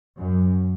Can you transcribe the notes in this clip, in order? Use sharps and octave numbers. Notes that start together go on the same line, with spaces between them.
F#2